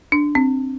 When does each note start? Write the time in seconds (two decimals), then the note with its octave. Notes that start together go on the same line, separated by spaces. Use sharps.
0.12 D4
0.35 C4